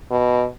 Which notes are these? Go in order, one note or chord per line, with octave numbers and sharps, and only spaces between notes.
B2